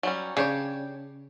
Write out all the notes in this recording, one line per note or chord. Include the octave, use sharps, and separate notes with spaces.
F#3 G3 C#4
C#3 D4 G4 C#5